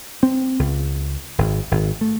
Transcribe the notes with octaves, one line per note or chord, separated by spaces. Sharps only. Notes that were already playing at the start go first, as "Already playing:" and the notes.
C4
C#2
G#1
G#1
A3